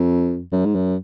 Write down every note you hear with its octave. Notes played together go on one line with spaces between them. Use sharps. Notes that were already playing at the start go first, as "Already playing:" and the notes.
Already playing: F2
F#2
G#2
F#2